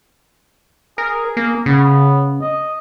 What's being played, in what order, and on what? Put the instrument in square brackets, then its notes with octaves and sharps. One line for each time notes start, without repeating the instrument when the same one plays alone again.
[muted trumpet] G#4 [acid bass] A#4
[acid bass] A#3
[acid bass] C#3 [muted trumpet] B3
[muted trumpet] D#5